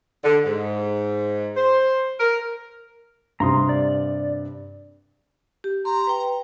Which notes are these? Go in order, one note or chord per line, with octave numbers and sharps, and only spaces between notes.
D3
G#2
C5
A#4
G2 C3 A#5 C6 D#6
D5
G4
A#5 C6
B4 G5